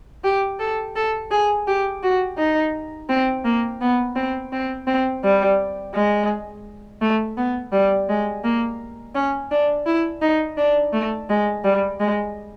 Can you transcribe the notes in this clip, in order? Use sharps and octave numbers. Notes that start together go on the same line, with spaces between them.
G4
A4
A4
G#4
G4
F#4
D#4
C4
A#3
B3
C4
C4
C4
G3
G#3
A3
B3
G3
G#3
A#3
C#4
D4
E4
D#4
D4
A3
G#3
G3
G#3